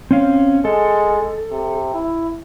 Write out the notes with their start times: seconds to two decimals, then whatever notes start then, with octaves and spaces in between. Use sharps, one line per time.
0.11 C4 C#4 F5
0.65 G#3 A4
1.51 C3
1.94 E4